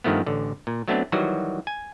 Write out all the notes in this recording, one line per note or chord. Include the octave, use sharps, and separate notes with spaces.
G2 D#3 F3 A3 B3
A1 D3
A#2
F#3 A3 B3 C4 D4
D#3 E3 F#3 G3 F#4
G#5